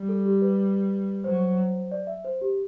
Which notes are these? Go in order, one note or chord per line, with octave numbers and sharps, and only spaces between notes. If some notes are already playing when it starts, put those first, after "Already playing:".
Already playing: G3
A4
G4
B4
F#3 C5
D5
E5
C5
G4